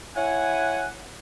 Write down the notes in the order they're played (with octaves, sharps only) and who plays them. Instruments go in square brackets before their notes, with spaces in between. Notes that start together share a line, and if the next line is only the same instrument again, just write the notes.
[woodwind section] E4 C#5 F#5 G#5